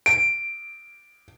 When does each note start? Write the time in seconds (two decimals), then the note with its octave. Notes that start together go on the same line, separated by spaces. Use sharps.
0.06 D7